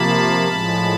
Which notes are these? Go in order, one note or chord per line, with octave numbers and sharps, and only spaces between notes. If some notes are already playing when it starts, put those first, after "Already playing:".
Already playing: C3 F3 A#3 A5 B5
A2 F3 G#3